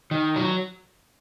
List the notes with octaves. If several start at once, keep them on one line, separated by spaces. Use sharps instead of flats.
D#3
F#3